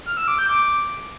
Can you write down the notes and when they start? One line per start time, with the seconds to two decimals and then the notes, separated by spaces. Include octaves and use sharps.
0.06 F6
0.17 E6
0.28 D6
0.38 G6
0.49 D6